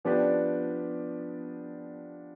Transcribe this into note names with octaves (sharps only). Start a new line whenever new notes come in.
F3 B3 D4 G4 D5